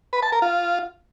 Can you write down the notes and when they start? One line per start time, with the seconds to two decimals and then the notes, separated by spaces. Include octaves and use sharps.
0.13 B4
0.23 A5
0.32 A#4
0.42 F4